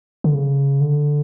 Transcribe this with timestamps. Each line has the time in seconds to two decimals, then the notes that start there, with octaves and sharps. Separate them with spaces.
0.24 D3
0.34 C#3
0.80 D3